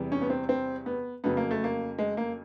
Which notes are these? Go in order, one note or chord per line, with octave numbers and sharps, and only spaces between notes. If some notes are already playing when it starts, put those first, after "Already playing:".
Already playing: E2 C3 E3 G3
C#4
B3
C4
C4
B3
F2 C#3 F#3 B3
A#3
A3
A#3
G#3
A#3